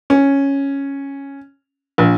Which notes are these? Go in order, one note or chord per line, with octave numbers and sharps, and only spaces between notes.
C#4
A#1